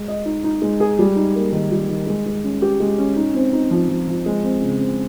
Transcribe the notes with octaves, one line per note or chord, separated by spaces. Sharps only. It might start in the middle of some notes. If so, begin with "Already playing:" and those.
Already playing: G#3
D#5
D#4
D#4
G#3
G#4
G3
D#4
A#3
D#3
G3
D#3
G#3
G#3
C#4
G4
G#3
C#4
D#4
C4
D#4
F3
F3
F3
G#3
C4
C#3
C4